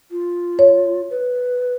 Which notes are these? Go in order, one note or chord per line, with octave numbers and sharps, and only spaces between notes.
F4
C#5
B4